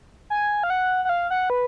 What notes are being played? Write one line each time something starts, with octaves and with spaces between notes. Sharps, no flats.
G#5
F5
F#5
F#5
F5
F#5
B4